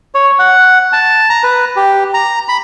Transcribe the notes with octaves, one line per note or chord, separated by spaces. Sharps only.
C#5
F#5
A5
A#5
B4
G4
A#5
B5